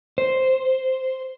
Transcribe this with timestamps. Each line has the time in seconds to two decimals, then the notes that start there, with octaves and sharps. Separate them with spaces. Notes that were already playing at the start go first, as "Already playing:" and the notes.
0.18 C5